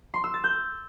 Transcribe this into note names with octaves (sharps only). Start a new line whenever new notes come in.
C6
E6
A6
G6